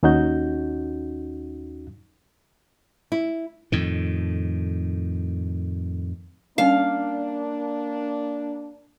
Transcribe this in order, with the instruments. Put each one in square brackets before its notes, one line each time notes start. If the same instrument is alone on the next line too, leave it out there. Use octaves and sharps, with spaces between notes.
[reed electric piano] D#2 C#4 D#4 F#4 G6
[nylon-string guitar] E4
[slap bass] F2 A2 D#3
[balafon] G3 C#4 [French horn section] A#3 D4 [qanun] F5